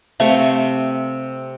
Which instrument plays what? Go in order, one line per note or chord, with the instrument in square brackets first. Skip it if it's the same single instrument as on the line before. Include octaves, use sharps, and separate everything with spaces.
[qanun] C3 A3 F5 C#6